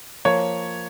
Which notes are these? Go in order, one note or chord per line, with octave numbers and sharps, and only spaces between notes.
F3 A#3 C#5